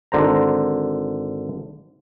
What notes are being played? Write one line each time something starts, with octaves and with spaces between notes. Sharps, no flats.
G#1 D3 C5 A#5